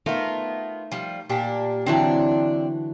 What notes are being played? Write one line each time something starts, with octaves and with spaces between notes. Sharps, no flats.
A3 B3 D#4 F4 A#4
F3 G3
A#2 D4 G4
D3 E3 F#3 C4 D4 A5